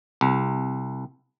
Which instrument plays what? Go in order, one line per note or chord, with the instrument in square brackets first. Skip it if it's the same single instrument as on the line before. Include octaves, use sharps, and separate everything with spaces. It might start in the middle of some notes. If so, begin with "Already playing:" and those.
[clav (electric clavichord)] C2